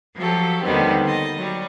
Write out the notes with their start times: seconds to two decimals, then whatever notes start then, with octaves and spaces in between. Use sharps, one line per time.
0.16 F3 F#3 G4 A4
0.63 D#2 D3 D#3 G3 B3 C4
1.05 D#5 A6
1.37 F#3 G3